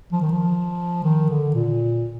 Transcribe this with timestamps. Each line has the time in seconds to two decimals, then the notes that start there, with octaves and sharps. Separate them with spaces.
0.12 F3
0.22 D#3
0.32 F3
1.04 D#3
1.29 D3
1.55 A#2